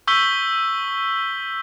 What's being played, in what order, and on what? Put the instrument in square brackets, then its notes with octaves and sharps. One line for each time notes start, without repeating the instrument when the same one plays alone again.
[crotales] C#6 E6 G6 B6 G7